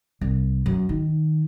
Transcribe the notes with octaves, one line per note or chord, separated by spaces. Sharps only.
C2
F#2
D#3